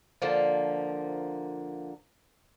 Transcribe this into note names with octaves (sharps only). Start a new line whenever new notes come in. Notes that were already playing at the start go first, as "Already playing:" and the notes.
D3 F3 A#3